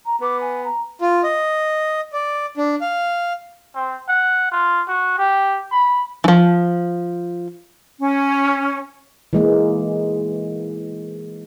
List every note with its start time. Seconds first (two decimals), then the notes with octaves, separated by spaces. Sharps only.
0.05 A#5
0.21 B3 D6
0.40 G#5
0.64 A#5
1.00 F4
1.24 D#5
2.13 D5
2.57 D4
2.81 F5
3.75 C4
4.08 F#5
4.52 F4
4.88 F#4
5.18 G4
5.72 B5
6.24 E3 F3
8.00 C#4
9.33 E3 G#3 A#3